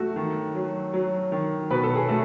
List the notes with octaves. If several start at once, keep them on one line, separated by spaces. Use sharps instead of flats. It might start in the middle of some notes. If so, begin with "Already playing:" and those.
Already playing: F#3 A3 F#4 A4
D#3
F#3
F#3
D#3
B2 B4
A4
G#4
A3 F#4 A4